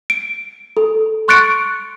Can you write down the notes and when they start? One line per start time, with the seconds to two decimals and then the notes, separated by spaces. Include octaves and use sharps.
0.10 D7
0.77 A4
1.28 C6 C#6 F#6 A6 C#7 D7